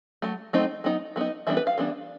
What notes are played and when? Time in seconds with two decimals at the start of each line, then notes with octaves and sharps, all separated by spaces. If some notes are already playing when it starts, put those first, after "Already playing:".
0.22 F#3 A3
0.53 F#3 A3 C4 D#4
0.84 F#3 B3 D#4
1.16 F#3 B3 D#4
1.47 E3 G3 B3 D4 E5
1.57 B4
1.67 F5
1.78 E3 G3 B3 D4